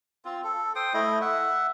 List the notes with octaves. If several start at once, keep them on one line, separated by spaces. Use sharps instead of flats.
C4 F4
A4
C5 G5 D#6
A3 E4 D#5
E5 F#5